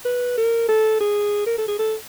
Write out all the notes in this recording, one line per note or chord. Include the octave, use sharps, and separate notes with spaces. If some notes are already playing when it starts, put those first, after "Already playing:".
B4
A#4
A4
G#4
A#4
A4
G#4
A4